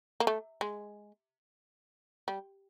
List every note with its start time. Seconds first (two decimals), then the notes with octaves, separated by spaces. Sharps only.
0.20 A#3
0.27 A3
0.61 G#3
2.28 G3